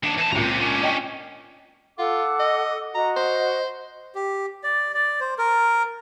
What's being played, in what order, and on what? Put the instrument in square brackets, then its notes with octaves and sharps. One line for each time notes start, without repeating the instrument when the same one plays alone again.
[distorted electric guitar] D#2 D4
E3 A5
[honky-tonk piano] C#2 A#2 [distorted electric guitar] C4 A#5
[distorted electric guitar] C#4 D4
[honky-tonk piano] D#5 G5 C#6
[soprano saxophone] F4 [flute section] A4 F#5 D6
[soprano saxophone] D#5
[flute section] F#4 D#5 [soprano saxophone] A#5
[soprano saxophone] C5
[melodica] G4
D5
D5
C5
A#4